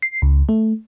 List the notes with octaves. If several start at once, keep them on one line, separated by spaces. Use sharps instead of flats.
C7
C#2
A3